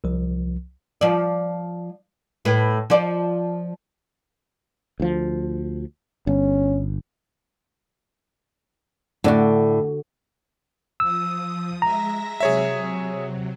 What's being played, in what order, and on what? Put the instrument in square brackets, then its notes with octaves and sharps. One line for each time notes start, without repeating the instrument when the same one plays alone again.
[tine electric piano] C2 F3
[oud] F3 D5
A2 B4
F3 F4 D5
[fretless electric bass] D2 F3
[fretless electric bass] G1 [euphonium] C#4
[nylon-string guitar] A2 D5 [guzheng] D3 F#4
[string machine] F3 D#6 [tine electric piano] E6
[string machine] G#3 E5 A#6 [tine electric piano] A#5
[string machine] C3 F#3 [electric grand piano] G#4 C#5 E5